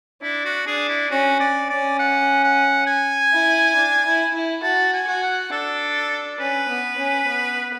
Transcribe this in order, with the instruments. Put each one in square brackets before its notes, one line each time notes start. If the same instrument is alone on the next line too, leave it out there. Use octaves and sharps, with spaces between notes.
[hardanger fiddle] D4 [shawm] E4
[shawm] F#4
[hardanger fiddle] D4 [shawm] G#4
[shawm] E4
[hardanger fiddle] C#4 [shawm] F#4
[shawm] D5
[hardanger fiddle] C#4 [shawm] D5
[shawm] F#5
F#5
G#5
[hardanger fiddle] E4
D4
E4
E4
[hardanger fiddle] F#4 [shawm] A5
[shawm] G#5
[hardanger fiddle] F#4
[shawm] F#5
[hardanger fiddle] D4 [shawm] A4
[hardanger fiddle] C#4 [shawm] B4
[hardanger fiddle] B3
C#4
B3